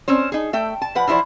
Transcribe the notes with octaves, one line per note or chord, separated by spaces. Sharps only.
C4 C#4 C5
D#4 G#4
A3 E5 G5
A5
F3 B4 F#5
E3 F3 E4 C5 D5